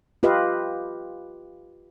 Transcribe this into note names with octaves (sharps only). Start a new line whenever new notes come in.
F4 G4 B4 D#5 F5